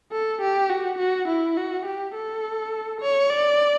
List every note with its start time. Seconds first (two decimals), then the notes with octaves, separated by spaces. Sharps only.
0.12 A4
0.42 G4
0.70 F#4
0.99 F#4
1.28 E4
1.57 F#4
1.86 G4
2.15 A4
3.01 C#5
3.30 D5